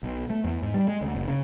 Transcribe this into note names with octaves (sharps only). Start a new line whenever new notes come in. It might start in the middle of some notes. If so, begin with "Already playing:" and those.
B1
A3
E2
G#2
G3
G#3
D2
F#1
C#3